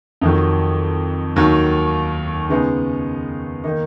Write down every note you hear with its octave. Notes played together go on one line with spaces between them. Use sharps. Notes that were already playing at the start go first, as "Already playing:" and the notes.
F2 D#3 F#3
D#2 D#3 F#3
C#3 G#3 B3 D#4
D#3 A#3 D#4